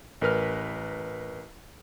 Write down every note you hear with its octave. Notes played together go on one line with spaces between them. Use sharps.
A1 A#4 B4 F6